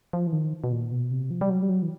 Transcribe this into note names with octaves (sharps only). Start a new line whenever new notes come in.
F3
E3
D#3
B2
A#2
B2
C3
F3
G3
F#3
G3
F#3
E3